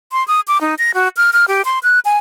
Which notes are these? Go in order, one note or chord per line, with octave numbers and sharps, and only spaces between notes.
C6
D#6
D6
D#4
A#6
F#4
F6
F6
G4
C6
F#6
G#5